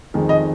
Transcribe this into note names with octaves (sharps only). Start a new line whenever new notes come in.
F2 D#3 G#3
D#5